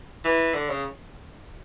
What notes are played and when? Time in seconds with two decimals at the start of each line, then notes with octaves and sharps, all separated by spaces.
0.24 E3
0.54 D3
0.70 C#3